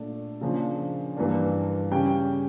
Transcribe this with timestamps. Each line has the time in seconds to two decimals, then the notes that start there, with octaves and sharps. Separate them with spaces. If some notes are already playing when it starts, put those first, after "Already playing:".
Already playing: A#2 A3 D4 A5
0.41 C#3 F3 A#3 D4
1.17 G2 E3 A#3 D4
1.92 C#3 G3 C#4 G5